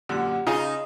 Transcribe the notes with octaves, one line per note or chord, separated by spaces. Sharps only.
F#2 A#2 D3 G4 F#5
C#3 D#4 F4 G#4 G#5